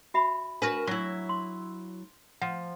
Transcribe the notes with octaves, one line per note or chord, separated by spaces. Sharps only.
F#4 E5 B5
D4 F#4 A#4 B4
F#3 E4 C#6
C6
F3 F#5